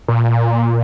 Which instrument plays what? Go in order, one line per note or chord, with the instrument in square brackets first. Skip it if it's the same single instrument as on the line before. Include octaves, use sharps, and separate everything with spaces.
[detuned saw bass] A#2